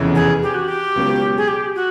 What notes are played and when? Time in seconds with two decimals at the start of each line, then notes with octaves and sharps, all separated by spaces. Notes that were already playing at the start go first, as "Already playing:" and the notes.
Already playing: F1 E2 C#3 E3
0.15 G#4
0.43 G4
0.54 F#4
0.68 G4
0.96 C#2 B2 F#3
1.37 G#4
1.48 G4
1.75 F#4